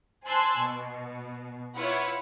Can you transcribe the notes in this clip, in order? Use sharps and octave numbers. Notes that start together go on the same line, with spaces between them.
C5 G#5 A5 C6 E6 F#6
B2
E4 F4 B4 C#5 F#5